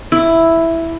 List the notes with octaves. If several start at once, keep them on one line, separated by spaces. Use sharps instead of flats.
E4